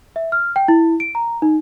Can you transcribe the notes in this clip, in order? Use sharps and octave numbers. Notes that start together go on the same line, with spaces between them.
E5
F6
G5
E4
D7
A#5
D#4